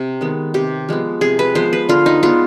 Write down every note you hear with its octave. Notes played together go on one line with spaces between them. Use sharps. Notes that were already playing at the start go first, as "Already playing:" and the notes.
Already playing: C3
D#3 G#3 B3
C3 G4
F3 G#3 B3
C3 G#4
B4
F3 G#3 B3 C5
B4
D3 F4
D#4
G#3 B3 F4